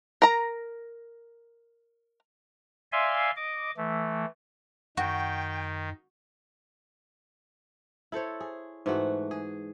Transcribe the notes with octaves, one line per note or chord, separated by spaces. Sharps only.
A#4 A#5
D5 E5 F5 G#5 C6
D#5 D6
E3 A3
F#2 D#3 F#4 G5
E4 A4 C5 C#5
G#4
G#2 E3 A3 F#4
G#4